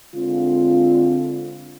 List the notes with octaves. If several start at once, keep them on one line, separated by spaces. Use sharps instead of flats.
D3 G#3 C4 F4